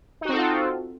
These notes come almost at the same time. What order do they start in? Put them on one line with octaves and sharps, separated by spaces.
D#4 F#4 C4 A4 F4